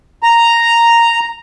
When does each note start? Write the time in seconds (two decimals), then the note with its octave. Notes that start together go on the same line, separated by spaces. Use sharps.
0.23 A#5